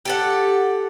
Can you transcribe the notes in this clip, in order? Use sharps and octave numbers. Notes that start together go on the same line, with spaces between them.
G4 A4 F#5